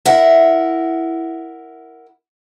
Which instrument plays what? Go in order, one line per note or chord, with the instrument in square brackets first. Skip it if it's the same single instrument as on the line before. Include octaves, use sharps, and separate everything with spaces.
[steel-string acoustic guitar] E4 A#4 F#5